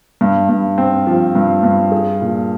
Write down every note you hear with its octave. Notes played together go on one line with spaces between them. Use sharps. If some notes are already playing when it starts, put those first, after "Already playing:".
G2
G2
C4
F3
G2
G2
G#4
A#2